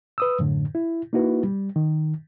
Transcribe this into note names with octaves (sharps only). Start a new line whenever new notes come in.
B4 D#6 E6
F#2 A2 D3
E4
A#3 D#4 E4 F#4 B4
G3
D#3